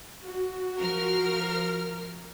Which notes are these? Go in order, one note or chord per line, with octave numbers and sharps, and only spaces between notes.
F#4
F3 A#4 F6